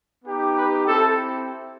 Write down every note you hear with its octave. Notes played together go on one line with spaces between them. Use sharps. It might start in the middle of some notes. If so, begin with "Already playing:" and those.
B3 D#4 G4
B4
C4 E4 G4 A4